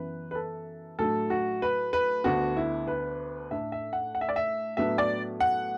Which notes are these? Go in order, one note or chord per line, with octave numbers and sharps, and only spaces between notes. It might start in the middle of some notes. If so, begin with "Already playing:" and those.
Already playing: F#2 E3 B3 B4
B4
A4
A2 F#3 A3 D4 A4
F#4
B4
B4
D2 D3 B3 D4 F#4
E4
B4
A2 A3 D4 E5
E5
F#5
F#5
E5
D5
E5
A2 F#3 B3 D4 E5
D5
F#5